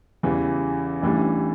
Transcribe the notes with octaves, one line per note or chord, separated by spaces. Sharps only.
E2 C#3 E3 G3
A1 A2 E3 G3 D4